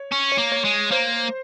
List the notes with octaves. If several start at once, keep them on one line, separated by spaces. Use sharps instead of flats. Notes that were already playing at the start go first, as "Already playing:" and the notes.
Already playing: C#5
C#4
C#5
A#3
C#5
G#3
A#3 C5